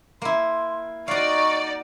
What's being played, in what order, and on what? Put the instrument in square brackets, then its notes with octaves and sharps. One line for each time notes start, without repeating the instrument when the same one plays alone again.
[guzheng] A#3 E4 [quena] C6
[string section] D#4 D5 [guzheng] F#4 F5 [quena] C#6